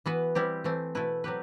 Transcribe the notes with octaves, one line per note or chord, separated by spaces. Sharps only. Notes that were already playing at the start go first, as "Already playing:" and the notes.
E3 B3 F#4 B4
G3 C4 E4 G4
E3 A3 C4
B2 A3 E4 B4
F#3 C4 G4 B4